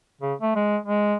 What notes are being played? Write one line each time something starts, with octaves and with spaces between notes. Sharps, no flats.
C#3
A3
G#3
G#3